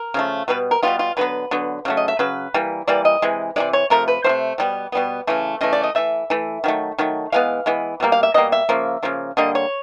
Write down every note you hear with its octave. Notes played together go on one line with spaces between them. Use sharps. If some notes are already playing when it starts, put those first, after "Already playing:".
Already playing: A#4
C#3 F3 A3
B2 G3 B3 B4
A#4
B2 G3 B3 F4
F4
D3 F#3 B3 B4
D3 F#3 B3
C#3 F#3 A3
D#5
E5
C#3 F#3 B4
E3 G3 A#3
E3 G3 A#3 D5
D#5
C3 E3 G#3
C3 E3 G#3 D5
C#5
C3 F3 A3 A#4
B4
C3 F3 A3 C5
B2 G3 B3
B2 G3 B3
C#3 E3 A3
C#3 E3 A3 D#5
D5
D#5
E3 A3 E5
E3 A3
D#3 F#3 A3
D#3 F#3 A3
E3 G#3 B3 F5
E3 G#3 B3
B2 G3 A#3
F5
E5
B2 G3 A#3 D#5
E5
C#3 F3 A#3
C#3 F3 A#3
D3 G3 A#3 D#5
C#5